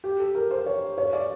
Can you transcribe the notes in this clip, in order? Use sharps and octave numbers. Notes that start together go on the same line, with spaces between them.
G4
A4
A#4
C5
C#5
C#5
D5